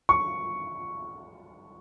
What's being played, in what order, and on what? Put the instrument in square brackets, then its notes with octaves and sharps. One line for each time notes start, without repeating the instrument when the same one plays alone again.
[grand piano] C#6